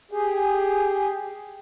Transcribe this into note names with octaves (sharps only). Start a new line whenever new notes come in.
G4 G#4